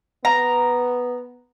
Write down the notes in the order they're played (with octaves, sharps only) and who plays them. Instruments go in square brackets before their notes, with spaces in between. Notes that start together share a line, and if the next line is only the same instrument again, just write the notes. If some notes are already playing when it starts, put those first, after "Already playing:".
[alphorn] B3 [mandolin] A#5